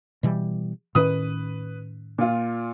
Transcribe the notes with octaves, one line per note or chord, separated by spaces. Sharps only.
B2 E3 G3
A2 D#3 C#4 B4 D#6
A#2 F4